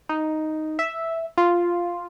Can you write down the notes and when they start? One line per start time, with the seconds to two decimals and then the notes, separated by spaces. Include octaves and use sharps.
0.09 D#4
0.79 E5
1.38 F4